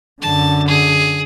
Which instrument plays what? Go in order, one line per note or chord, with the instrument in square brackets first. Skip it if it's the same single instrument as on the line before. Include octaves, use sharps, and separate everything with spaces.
[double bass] F#2 D3 [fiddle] A5
[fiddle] G#4